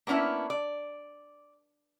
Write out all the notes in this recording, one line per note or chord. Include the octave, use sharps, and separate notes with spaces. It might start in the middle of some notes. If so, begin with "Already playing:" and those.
A#3 B3 C#4 D4 E4
D5